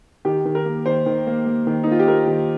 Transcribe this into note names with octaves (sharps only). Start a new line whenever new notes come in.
D#3 G4
D#3
A#4
A#3
D#3 C5
D#3
A#3
A#3
D#3
D#4
A#3 F4
G4
A#3 A#4
D#3